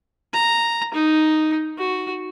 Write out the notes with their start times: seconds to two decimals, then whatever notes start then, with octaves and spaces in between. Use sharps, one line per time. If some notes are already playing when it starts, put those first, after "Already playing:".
0.34 A#5
0.94 D#4
1.79 F#4